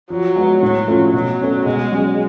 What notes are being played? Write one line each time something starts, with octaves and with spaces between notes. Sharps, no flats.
F3 F#3
G#3 B3 F#4
A2 F#3
F3 A3 C#4 F4
B2 F#3
A3 C#4 F#4
B2 G#3
F#3 C#4 G#4